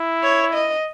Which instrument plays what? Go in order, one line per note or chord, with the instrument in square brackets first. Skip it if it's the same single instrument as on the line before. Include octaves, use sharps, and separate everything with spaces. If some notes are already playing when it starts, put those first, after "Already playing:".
Already playing: [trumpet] E4
[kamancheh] C#5
D#5